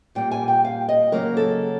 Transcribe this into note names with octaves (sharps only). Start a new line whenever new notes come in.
A#2 G3 A#3 G5
G#5
G5
F5
D#5
C#3 F#3 A#3 A#4
A4